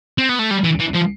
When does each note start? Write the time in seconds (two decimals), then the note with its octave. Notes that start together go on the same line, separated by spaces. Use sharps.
0.18 C4
0.29 B3
0.39 A3
0.51 G3
0.64 E3
0.80 E3
0.95 F3